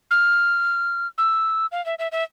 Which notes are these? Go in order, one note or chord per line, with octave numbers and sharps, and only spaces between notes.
F6
E6
F5
E5
E5
E5